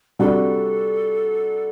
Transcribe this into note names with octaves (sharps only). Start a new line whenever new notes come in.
C3 G3 D4 F#4 A4